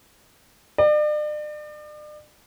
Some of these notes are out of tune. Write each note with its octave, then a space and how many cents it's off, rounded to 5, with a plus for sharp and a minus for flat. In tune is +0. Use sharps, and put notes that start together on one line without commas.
D5 +40